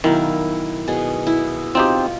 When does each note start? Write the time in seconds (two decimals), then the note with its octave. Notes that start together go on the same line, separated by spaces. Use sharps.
0.04 B1 D#3 E4 F5
0.88 B2 G#4
1.27 E4
1.75 C4 D#4 F4 G4